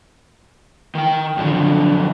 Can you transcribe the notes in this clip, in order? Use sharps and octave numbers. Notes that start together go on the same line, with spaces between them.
D#3 G5
F#2 D3 F3